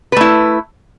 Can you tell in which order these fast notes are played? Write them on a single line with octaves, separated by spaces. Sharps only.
B4 A3 E4